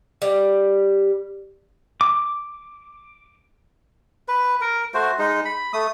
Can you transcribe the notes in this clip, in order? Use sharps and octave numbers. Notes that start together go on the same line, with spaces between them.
G3
D6
B4
A#4
A3 F#4 C5
G#3 D#4
B5
A3 D#6